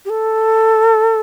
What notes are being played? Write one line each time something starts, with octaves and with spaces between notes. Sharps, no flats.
G4
A4